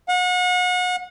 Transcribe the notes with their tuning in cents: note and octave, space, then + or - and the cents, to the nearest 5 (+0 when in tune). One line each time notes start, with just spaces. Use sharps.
F#5 -35